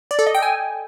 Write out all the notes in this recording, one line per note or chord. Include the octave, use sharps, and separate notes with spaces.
D5
A4
D#5
G5
G#5